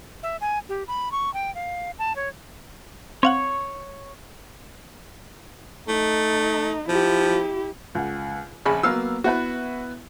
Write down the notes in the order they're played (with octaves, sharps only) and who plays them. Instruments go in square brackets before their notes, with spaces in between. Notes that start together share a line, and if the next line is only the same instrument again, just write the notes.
[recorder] E5
G#5
G4
B5
C#6
G5
F5
A5
C#5
[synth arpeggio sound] C4 F5 F#5 [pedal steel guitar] C#5 C#6
[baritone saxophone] A3 [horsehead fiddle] D#4
[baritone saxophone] F3 [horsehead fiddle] E4 G4
[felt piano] C#2 F#5
[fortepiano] A#1 C#3 B5 [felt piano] G#5
[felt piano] F#3 A#3 B3 [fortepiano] F5 E6
[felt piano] B3 E4 B4 [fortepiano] F#4